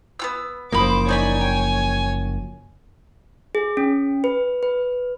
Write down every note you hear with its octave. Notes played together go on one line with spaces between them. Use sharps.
B3 F4 E6
F#1 F3 A#3 C5 B5 D6 D#6
D#4 C#5 D5 G#5 B5
G5
G#4
C#4
B4
B4